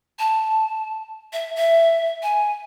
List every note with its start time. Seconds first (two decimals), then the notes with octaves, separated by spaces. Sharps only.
0.19 A5
1.33 E5
1.56 E5
2.23 G#5